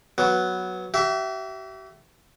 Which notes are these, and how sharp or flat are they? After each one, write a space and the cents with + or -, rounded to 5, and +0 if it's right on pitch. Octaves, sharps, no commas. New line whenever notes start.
F#3 +0 B3 +0
G4 -45 E5 +10